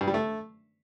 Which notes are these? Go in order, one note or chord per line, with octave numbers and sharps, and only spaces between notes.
G2
G3
A3